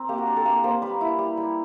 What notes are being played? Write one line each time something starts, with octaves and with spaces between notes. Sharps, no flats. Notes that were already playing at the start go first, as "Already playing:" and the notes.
Already playing: C4 A#4
A#3 G4
F#4
D4 G4
A4
A#3 A#4
A#3 C5
G3 B4
E4
G3
G3